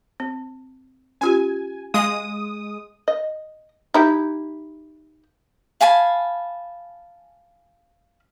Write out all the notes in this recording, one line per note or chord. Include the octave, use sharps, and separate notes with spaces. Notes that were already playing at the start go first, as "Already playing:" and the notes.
C4
C#4 F4 G4 G#5
G#3 F5 G#5 D#6
D#5
D#4 E4 G4
F5 G#5 A5 B5